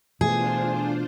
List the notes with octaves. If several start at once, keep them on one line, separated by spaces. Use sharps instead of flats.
B2 E3 A3 D4 F4 G#4 C5